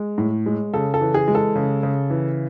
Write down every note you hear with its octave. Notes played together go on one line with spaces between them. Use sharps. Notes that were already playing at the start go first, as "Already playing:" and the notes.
Already playing: G#3
A2
G#3
C#3 A4
A4
E3
G#4
G#3
A4
C#3
C#3
E3